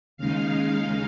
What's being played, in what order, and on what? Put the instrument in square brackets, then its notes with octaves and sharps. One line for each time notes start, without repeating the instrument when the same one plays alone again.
[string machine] D#2 C#3 G#3 D#4 F5